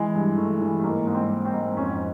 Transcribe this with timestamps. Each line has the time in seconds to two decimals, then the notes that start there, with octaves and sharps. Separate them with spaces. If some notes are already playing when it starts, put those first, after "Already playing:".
Already playing: E3 G#3
0.15 G2
0.37 E3 A3
0.61 E3
0.79 A3
0.84 G#2 A#3
1.07 G#2
1.15 C4
1.30 G#2
1.45 C4
1.53 G#2
1.76 F2 C#4